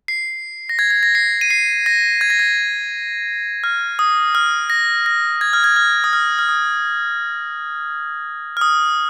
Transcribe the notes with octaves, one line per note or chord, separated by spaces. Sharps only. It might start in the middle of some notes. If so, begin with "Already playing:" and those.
C7
A#6
G#6
G#6
A#6
C7
D#7
C7
A#6
G#6
A#6
G#6
F6
D#6
F6
A#6
A#6
G#6
F6
G#6
F6
D#6
F6
F6
D#6
F6
D#6